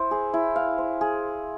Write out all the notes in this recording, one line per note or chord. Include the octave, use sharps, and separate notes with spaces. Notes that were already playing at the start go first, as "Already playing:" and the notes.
Already playing: E4 C5
G#4
E4
F5
C5
G#4